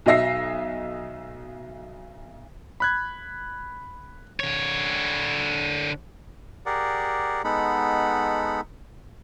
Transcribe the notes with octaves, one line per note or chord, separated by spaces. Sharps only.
B1 F#3 D#5 E5 A#6 C7
B5 F#6 G#6
D3 C#5
G4 G#4 A#4 D5 F#5
G#3 B3 D#4 A4 F#5 B5